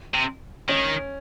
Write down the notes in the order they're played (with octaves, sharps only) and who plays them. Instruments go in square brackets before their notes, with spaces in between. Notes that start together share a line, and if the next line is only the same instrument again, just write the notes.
[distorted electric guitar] C3
[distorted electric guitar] D#3 [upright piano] C#4